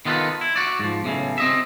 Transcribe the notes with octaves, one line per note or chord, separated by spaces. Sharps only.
D#3 B3 F4 F#4 A4 B4
E4
F#4 D5
G#2 F3
B1 A2 C#3
C4 D#5 E5